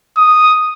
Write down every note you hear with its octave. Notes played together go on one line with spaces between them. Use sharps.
D#6